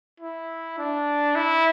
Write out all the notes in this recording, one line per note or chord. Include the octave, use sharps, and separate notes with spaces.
E4
D4
E4